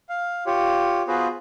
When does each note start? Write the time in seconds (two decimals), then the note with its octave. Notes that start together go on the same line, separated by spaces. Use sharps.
0.09 F5
0.46 F4 G4 C#5
1.07 B3 F4 F#4 G#4 B4 C5